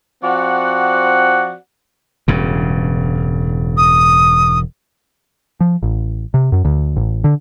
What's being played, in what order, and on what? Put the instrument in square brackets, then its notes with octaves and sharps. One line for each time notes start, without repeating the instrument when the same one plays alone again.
[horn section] F3 C4 F#4 D5 F#5
[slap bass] E1 G2 C#3
[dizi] D#6
[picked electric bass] F3
A1
C3
F#2
D2
A1
D3